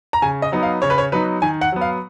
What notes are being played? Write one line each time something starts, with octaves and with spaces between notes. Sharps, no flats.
A#5
C#3 G#5
D#5
F#3 B3 D#4
F5
C#3 C#5
B4
C#5
F#3 B3 D#4 B4
D#3 G#5
F#5
F#3 B3
F5